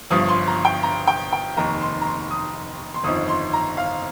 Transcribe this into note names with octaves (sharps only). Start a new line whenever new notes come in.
G1 G2 F3 D#6
C6
A#5
G5
A#5
G5
G5
F1 D#2 D#3 A#5
C6
A#5
C6
D#6
C6
G1 F2 D#3 D#6
C6
A#5
F5